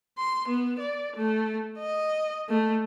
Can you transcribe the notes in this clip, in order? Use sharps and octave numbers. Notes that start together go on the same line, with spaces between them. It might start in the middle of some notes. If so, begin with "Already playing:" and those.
C6
B3
D5
A3
D#5
A3